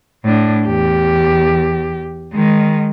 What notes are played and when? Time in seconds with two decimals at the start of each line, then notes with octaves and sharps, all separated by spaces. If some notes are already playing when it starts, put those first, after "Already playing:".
0.25 A2 D4
0.66 E2 G4
2.33 D#3 G#3